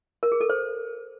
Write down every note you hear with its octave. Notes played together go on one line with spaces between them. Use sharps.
A#4
G#4
A4
C5